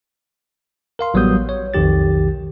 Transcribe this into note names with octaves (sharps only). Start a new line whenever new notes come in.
A#4 F5 C6
A1 F#3 G3 B3 D#6 G6
C#5
B1 F2 D#3 G4 A6